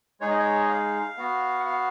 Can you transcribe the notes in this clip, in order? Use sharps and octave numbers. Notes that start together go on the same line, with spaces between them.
G#3 D#4 G#4 C#5
D#5
C#5
D#5
F5
B3 F#4
F#5
F5